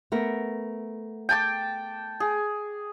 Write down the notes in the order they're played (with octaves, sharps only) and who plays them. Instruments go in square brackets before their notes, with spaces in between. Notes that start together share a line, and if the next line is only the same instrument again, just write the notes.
[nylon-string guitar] A3 B3 A#4
[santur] G5 A5 D6
G#4